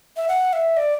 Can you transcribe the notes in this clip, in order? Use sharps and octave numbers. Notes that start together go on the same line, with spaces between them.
E5
F#5
E5
D5